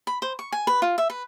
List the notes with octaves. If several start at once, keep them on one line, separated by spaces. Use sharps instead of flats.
B5
C5
C#6
G#5
B4
F4
E5
B4